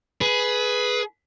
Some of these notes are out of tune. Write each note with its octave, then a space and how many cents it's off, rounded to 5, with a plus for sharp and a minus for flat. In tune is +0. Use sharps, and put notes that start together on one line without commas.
G#4 +15 B4 +0